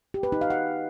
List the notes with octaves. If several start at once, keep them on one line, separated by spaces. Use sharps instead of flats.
G4
B4
D#4
F5
F#5